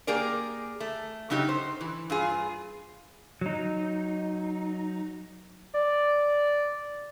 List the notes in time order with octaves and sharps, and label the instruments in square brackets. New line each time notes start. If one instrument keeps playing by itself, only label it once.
[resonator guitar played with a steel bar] A#3 G4 G#4 A#4 D5
A3
C#3 F#3 D#4 G4
C5
E3
G2 F4 G#4
[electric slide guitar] F#3 D#4
[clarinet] D5